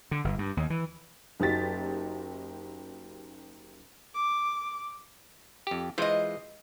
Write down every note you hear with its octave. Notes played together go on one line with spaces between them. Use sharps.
D3
G1
G2
D#2
E3
F#1 F#3 D#4 G4 A6 B6
D6
F2 G4
E3 G#3 F4 C5 D#5